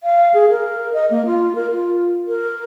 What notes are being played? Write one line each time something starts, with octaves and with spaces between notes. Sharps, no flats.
F5
G#4
A#4
D#5
A#3
F4
A#4
F4
A#4